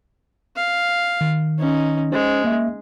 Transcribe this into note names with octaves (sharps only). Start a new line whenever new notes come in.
F5
D#3
C#4 D#4
G#3 C#4 C5
A#3 E5